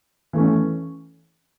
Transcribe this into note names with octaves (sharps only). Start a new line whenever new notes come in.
E3 A3 C#4